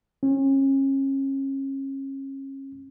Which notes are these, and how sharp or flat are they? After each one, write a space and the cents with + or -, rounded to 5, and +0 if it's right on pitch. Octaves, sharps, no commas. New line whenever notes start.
C#4 -35